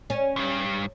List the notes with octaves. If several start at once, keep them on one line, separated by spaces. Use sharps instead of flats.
C#4
D2 G2